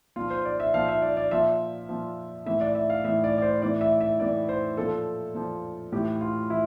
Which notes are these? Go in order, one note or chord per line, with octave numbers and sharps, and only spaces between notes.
A#2 F3 F4
C5
D5
E5
A#2 F3 F5
E5
D5
D5
A#2 F3 E5
A#2 F3
A2 E3 E5
D5
E5
F5
A2 E3 E5
D5
D5
C5
A2 E3 D5
E5
E5
A2 E3 D5
C5
A#2 F3 A4
A#2 F3
A2 E3 G4
F4
E3 E4